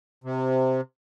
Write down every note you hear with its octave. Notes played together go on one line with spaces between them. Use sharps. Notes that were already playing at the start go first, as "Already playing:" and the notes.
C3